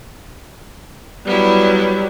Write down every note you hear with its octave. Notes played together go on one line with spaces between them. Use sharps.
F#3 G3 B3 E4